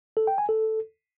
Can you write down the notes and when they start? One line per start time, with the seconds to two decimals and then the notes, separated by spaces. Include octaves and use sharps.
0.17 A4
0.27 G5
0.38 G#5
0.49 A4